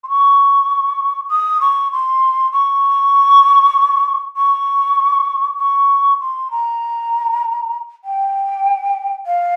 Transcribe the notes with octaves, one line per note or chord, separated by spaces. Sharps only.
C6
C#6
D#6
C#6
C6
C#6
C#6
C#6
C6
A#5
G5
F5